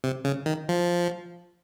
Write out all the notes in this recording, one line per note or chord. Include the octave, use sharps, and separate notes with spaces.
C3
C#3
D#3
F3